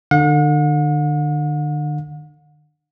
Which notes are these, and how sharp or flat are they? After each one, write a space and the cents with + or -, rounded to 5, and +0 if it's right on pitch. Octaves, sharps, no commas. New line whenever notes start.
D3 +35 F#5 -45